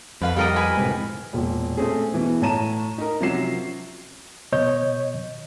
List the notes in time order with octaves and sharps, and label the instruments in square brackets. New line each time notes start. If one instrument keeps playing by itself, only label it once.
[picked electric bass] F2 [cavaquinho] B4 F5 B5
[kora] G3 A#4 D#5 [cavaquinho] G5 A#5
[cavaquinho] B4 G#5 B5
[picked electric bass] A2 C3 G#3
[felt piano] E1 A#2
A3 C4 C#4 G#4
B2 E3
A2 C#5 A5 A#5 D#7 E7
D#4 A#4
C3 F3 F#3 C#4 C7 E7
[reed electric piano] B2 C#5 D#5 G6